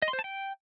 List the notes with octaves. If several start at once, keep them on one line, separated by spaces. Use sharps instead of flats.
D#5
C6
C5
A5
G5